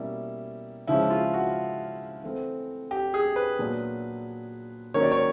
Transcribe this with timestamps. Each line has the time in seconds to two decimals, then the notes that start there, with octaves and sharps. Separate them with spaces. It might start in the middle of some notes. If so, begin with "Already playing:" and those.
Already playing: B2 G3 A#3 C#4 E4
0.88 C#3 F3 G#3 C#4 E4
1.10 F4
1.34 F#4
2.23 E3 A3 C4
2.91 G4
3.14 G#4
3.36 B4
3.59 A#2 F#3 B3 D4
4.94 D#3 F#3 A#3 C#4 C#5
5.03 D5
5.12 C#5